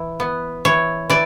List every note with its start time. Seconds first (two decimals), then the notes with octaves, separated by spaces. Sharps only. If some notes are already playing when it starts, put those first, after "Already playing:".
Already playing: E3
0.20 B3
0.65 E3 C#5
1.10 E3 D5